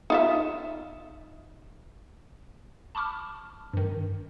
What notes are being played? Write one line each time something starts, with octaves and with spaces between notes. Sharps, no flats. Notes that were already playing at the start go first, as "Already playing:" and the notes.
D#4 F4 E5
A5 B5 C#6 D6 F6
G2 D#3